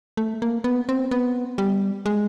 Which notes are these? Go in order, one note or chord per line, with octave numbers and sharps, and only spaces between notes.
A3
A#3
B3
C4
B3
G3
G#3